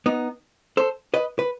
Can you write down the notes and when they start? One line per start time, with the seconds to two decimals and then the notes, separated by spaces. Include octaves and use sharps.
0.06 B3 D#4
0.77 A4 C5
1.14 B4 D#5
1.39 B4